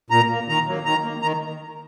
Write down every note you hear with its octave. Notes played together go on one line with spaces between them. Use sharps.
A#2 A#5
A#3
D#3 A#5
F#3 A#3
D#3 A#5
A#3
D#3 A#5